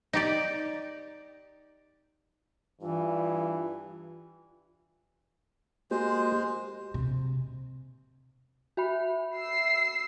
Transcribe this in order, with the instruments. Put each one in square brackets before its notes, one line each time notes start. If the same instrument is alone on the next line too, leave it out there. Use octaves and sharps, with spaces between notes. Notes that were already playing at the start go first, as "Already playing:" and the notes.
[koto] D#4 G4 D5
[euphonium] G2 [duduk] E3 [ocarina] F4
[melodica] G#3 C5 [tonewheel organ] A#3 F#4 G4
[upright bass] C3
[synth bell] F#4 E5 B5
[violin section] E6 C7